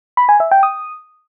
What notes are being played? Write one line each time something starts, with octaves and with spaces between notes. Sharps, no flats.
B5
G#5
E5
G5
D#6